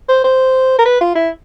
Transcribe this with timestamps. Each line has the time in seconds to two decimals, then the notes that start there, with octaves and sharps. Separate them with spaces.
0.09 C5
0.24 C5
0.79 A#4
0.86 B4
1.01 F4
1.15 E4